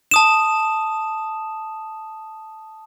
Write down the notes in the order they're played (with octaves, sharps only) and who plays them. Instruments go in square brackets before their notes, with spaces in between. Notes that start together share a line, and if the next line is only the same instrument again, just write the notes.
[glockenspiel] A5 D#6 E7